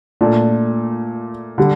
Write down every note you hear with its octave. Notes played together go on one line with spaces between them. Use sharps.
A#2 A3 D4
D3 G3